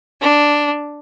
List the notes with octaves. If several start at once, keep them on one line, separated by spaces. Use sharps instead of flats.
D4